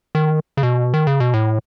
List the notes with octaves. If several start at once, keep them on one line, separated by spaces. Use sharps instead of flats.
D#3
C#3
B2
D#3
C#3
B2
A2